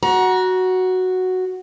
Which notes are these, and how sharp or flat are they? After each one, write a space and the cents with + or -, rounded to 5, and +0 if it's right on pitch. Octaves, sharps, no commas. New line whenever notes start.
F#4 +0 A#5 +30